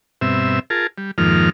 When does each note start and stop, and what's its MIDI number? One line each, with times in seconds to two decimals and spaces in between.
0.21 0.59 43
0.21 0.59 47
0.21 0.59 60
0.21 0.59 76
0.70 0.87 65
0.70 0.87 68
0.70 0.87 70
0.70 0.87 81
0.98 1.11 55
1.18 1.50 41
1.18 1.50 44
1.18 1.50 51
1.18 1.50 53
1.18 1.50 58
1.18 1.50 89